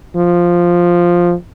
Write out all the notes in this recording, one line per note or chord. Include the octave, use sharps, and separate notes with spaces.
F3